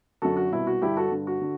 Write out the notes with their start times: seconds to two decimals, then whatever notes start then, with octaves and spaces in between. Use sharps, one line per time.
0.22 F#2 D3 F#4 A4
0.37 F#4
0.52 C2 B2 E4
0.67 F#4
0.82 G2 D3 E4 G4
0.97 F#4 A4
1.12 G2 D3
1.27 F#4
1.41 D3